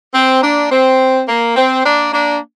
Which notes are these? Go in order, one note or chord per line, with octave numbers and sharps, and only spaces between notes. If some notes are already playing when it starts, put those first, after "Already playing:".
C4
A#3 D4
C4
A#3
C4
A#3 D4
A#3 D4